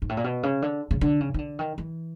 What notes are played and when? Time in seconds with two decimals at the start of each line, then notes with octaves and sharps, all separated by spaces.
0.02 G#2
0.09 A2
0.17 A#2
0.24 B2
0.43 C#3
0.62 D3
0.91 C#3
1.01 D3
1.20 C#3
1.34 D#3
1.38 D3
1.59 D#3
1.78 E3